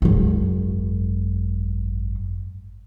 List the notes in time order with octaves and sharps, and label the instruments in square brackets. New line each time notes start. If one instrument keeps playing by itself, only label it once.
[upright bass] G#1 F#2